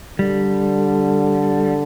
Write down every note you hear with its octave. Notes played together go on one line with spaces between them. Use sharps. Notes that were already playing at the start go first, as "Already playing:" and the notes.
D3 G3